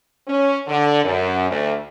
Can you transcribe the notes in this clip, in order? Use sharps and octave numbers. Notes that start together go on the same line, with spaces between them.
C#4
D3
F#2
D2